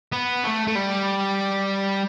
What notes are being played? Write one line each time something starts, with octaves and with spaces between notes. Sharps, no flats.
B3
A3
A3
G3